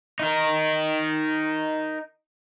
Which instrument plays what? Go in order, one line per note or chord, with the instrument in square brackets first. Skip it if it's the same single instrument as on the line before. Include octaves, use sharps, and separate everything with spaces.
[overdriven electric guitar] D#4 A#4